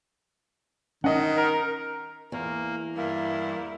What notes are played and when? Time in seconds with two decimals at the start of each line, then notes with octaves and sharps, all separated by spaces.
1.04 D#3 C#4 D#5 F#5
1.37 A#4
2.32 E2 A#3
2.95 G2 A#3 E4